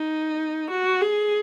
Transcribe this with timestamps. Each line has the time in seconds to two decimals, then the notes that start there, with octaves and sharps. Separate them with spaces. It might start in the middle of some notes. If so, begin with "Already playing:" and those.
Already playing: D#4
0.70 F#4
1.01 G#4